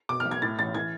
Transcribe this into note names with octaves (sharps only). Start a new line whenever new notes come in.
B2 D6
F6
B1
G#6
A2 A6
A1 A6
E3 G#6